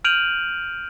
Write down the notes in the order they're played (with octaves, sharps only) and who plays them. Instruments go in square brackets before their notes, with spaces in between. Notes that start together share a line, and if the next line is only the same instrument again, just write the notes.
[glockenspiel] F6 G6 D7 D#7 F7 F#7